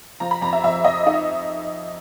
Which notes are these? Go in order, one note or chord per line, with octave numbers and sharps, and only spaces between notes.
F3 A#5
B5
F2 A#5
E5
F2 E5
F2 D#5
D#4 D#5
E5